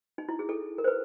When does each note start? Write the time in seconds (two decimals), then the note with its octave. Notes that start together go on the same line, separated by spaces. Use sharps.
0.18 D#4
0.29 E4
0.39 G#4
0.49 A4
0.78 A#4
0.84 C5
0.88 B4